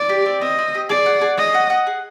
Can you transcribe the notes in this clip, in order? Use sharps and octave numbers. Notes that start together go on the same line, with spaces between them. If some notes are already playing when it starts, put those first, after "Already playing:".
Already playing: D5
G4
C4
C4 D#5
C4
G4
G#4 D5
F#5
G#4
C#5 D#5
F#5
F#5
G#4